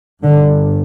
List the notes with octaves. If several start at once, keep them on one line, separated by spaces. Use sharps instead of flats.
G1 G2 D3